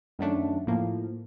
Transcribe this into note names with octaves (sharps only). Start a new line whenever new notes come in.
F#2 D#3 F#3 A3 D4
A2 F3 A#3